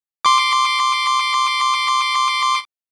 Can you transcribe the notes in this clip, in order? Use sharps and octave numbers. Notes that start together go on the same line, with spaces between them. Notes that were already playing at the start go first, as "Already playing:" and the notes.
C6 D6